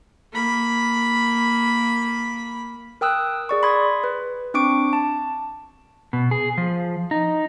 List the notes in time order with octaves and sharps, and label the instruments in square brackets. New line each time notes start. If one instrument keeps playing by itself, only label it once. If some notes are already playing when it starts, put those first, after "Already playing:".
[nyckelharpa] A#3 B5
[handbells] A#4 G5 D#6 E6 F#6
G#4 D5 C#6
B5 C6 D#6 G#6
B4
C4 D4 C#6 D6 D7
A5
[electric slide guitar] B2
G#4
F3
D#4